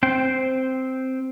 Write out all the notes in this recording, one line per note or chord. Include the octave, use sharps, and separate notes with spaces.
C4 C5 G5